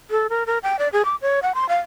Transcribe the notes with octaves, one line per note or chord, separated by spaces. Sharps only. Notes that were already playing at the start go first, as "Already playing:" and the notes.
A4
A#4
A#4
G5
D5
G#4
D6
C#5
F#5
C6
F5